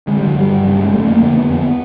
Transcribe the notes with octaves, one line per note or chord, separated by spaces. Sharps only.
D3 G#3
D3 G3
F#3
G2 G3
G2
C#3 G3
C#3 G#3
F2 A3
F2 A#3
D3 A#3
D3 B3
F2 B3